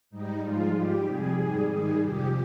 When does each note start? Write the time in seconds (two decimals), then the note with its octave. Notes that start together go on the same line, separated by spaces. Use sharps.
0.10 G#2 G3 D#4
0.42 G#2 F3 G#3 F4
0.74 G#2 G3 G4
1.05 F2 C3 G3 G#4
1.38 G#2 G3
1.69 G#2 D#3 G3 G#4
2.01 F2 C3 F3 G4